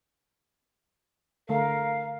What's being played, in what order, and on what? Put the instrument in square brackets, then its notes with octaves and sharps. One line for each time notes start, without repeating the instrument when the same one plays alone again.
[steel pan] D3 A3 [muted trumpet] A#4 [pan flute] F5